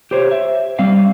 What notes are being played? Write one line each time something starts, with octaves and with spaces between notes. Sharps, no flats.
G4 C5 C#5
E5
G3 C4 F5